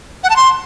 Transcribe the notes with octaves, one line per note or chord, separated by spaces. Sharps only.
F#5
A5
C6